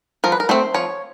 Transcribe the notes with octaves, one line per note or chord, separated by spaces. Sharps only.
F3 A#4
B4
A#4
A3 C4 C5
F3 C#5